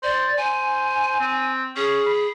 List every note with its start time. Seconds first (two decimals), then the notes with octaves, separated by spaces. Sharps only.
0.03 C5 D5
0.37 C5 G#5
1.20 C4
1.76 C#4 G#4
2.06 B5